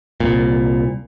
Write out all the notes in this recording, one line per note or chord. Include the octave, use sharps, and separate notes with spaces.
C2 A#2